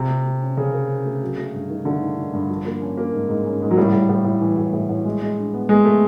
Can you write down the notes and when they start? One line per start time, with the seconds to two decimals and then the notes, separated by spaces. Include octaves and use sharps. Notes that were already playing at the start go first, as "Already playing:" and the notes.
Already playing: C3 F4
0.09 A3
0.25 A3
0.41 C#4
0.57 C#3 A#4
0.73 A#4
0.89 C#4
1.05 A3
1.21 F#3
1.38 A3
1.54 G2
1.70 D#3
1.85 D3 A3
2.02 D#3
2.17 D#3
2.34 G2
2.49 F3
2.65 A#3
2.82 C#4
2.97 A#3
3.13 G#2
3.29 G#2
3.45 C#4
3.62 G#2
3.71 F#3
3.77 A2 G3
3.93 A2
4.09 A2
4.25 A2
4.41 E3
4.57 A2
4.73 A2
4.89 A2
5.05 G#3
5.22 G#3
5.38 D4
5.54 B3
5.69 G#3 B3
5.85 G#3 A3